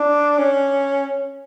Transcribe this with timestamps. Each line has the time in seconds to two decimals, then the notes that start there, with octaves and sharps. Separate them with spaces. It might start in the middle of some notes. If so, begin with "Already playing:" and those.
Already playing: D4
0.39 C#4